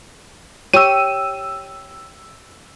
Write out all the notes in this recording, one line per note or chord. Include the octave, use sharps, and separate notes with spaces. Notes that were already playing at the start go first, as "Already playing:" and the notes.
G4 C#5 E6 D#7